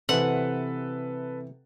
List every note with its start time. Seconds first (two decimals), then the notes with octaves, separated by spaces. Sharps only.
0.09 C3 E3 A4 B4 C5 F#5